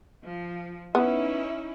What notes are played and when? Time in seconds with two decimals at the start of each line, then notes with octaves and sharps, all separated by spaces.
0.22 F3
0.95 B3 C#4 D#4 E4